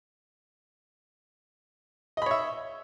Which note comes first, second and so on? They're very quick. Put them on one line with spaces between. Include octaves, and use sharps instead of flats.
D#5 B5 C#5 E5